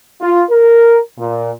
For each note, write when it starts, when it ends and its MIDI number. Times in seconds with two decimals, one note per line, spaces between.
0.20 0.42 65
0.49 0.98 70
1.18 1.50 46